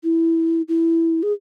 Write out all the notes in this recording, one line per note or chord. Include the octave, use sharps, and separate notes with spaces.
E4
E4
G#4